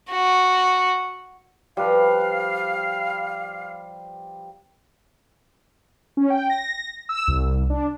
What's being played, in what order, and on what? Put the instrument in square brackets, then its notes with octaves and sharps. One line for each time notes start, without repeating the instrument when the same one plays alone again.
[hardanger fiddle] F#4
[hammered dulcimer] F3 B4 [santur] G3 [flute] F5
[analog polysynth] C#4
G5
A#6
E6
C2
D4